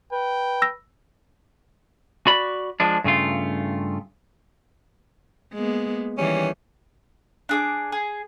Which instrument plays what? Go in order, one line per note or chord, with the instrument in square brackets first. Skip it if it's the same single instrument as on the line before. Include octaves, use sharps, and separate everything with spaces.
[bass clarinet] B4 [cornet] G5
[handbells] E6 A#6
[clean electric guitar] F#4 D5 B5
F3 G#3 D4
G2 C#3 A3 F4
[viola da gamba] G#3 A#3 B3
[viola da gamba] D#3 E3 G3 [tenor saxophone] C#4
[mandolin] D4 G#4 D6
G#4